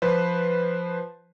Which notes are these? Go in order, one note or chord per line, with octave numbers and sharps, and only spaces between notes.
F3 B4 C5